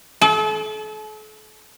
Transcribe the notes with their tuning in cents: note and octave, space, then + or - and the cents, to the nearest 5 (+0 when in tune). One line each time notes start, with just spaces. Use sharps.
A4 -40